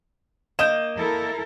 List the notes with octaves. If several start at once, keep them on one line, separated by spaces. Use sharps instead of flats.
A#3 D#5 G6 E7
E4 A4 A#4